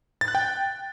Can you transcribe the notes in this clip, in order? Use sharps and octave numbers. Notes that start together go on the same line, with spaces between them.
A6
F#6
G5